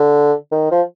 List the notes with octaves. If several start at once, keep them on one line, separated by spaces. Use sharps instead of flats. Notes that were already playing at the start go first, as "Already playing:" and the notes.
Already playing: D3
D#3
F3